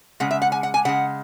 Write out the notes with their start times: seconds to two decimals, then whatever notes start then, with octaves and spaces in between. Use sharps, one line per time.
0.20 C#3 G#3 F#5
0.31 E5
0.42 F#5
0.52 G#5
0.63 F#5
0.74 G#5
0.85 C#3 G#3 F#5